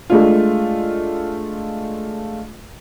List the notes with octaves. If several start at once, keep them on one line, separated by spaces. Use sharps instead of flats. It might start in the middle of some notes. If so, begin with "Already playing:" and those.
G#3 A3 D4 F4